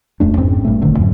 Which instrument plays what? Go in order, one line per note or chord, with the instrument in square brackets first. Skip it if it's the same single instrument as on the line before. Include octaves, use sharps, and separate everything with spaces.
[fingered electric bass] D1 F2 A3 D4
G#1 G#2 C4 C#4
G2 A#2 A3
F#1 D3 D#3 A3
F2 G#2 F#3